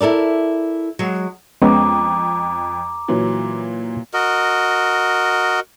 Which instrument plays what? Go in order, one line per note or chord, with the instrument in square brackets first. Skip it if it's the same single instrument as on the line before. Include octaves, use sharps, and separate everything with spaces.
[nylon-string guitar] E4 A4 A#4 D5
F#3 G#3
[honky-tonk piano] F2 [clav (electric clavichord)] G#3 B3 C#4 [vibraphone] A#5 D6
[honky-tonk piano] A#2 E3 F#3
[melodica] F#4 A#4 D#5